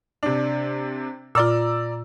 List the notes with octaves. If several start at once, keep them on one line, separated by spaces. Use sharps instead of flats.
C3 D4
A#2 F4 D5 A#5 E6